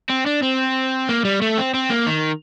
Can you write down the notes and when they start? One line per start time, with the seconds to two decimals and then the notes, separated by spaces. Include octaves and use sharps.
0.10 C4
0.27 D4
0.43 C4
1.09 A#3
1.25 G3
1.42 A3
1.58 C4
1.74 C4
1.90 A#3
2.07 D#3